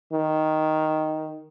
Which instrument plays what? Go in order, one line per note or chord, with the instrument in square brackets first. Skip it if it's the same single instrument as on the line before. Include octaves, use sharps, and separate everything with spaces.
[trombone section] D#3